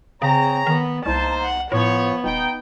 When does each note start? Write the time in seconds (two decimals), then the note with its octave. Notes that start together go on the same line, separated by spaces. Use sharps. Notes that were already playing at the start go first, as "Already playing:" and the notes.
0.22 C#3 C4 G#4 C#5 A#5
0.67 D#3 B3
1.06 C2 A#3 D#4 C5 A5
1.42 F#5
1.72 A2 F3 B3 C#5
2.24 D#1 D#4 G5